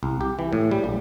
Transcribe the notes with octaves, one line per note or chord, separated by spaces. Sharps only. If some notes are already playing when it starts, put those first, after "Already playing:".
C2
G4
E3
A2
G3
A#1